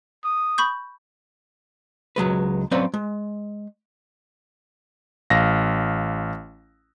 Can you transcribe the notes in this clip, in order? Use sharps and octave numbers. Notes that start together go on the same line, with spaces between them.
D#6
B5 C#6 G6
C#2 F#3 G#3 B4
F#3 C4 C#4 B4 D5 F5
G#3
A1 F5 A#6